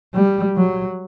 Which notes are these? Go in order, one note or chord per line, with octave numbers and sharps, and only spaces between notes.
G3
F#3